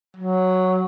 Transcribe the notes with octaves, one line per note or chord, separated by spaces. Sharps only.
F#3